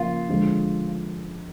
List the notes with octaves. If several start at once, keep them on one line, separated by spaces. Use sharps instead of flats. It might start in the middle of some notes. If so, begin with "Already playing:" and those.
Already playing: C#3 F3 A#3 F4
D3 F3 G#3